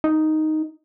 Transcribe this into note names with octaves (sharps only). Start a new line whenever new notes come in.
D#4